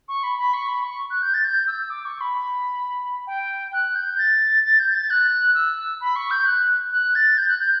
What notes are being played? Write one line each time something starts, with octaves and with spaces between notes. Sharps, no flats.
C#6
B5
B5
C#6
B5
C#6
F#6
G6
A6
G6
E6
D6
C#6
B5
G5
F#6
G6
A6
A6
G6
A6
F#6
E6
B5
C#6
G6
F#6
F#6
A6
G6
F#6
G6